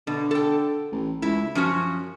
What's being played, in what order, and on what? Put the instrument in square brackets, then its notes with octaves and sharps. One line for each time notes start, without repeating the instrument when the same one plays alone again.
[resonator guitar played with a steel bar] B2 [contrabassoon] D3
[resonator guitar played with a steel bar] A4 G5
[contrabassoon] A1
[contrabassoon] C#2 [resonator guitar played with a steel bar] E4
[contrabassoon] F#2 [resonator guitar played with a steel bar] F3 C#4 F#4